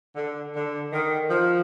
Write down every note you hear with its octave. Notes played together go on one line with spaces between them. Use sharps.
D3
D3
D#3
F3